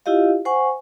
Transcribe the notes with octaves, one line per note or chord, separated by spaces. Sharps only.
E4 F4 G4 D#5 F5
C5 F#5 G#5 C#6